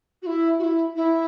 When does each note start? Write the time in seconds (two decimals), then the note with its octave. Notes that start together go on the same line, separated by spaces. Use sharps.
0.22 F#4
0.27 E4
0.59 F#4
0.63 E4
0.96 E4